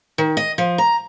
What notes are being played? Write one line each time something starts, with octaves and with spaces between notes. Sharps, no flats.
D#3
D#5
F3
A#5